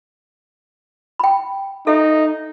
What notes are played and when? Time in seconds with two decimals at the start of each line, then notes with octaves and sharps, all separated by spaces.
1.19 G5 B5
1.87 D#4 A4 E5